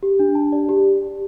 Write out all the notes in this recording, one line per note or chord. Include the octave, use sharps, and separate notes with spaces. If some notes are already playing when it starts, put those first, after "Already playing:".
G4
D4
A5
D5
G4